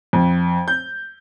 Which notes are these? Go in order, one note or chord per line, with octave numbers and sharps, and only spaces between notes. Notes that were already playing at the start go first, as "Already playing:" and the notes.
F2
G6